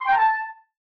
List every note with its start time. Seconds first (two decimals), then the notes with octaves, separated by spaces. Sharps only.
0.01 C6
0.06 G5
0.11 A#5
0.16 A5